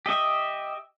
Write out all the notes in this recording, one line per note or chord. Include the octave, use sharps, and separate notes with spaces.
G4 D#5 E5